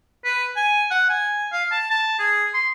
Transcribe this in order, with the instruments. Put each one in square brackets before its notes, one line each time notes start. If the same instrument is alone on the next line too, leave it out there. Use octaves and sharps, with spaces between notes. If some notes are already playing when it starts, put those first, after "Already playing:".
[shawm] B4
G#5
F#5
G#5
F5
A5
A5
G#4
C6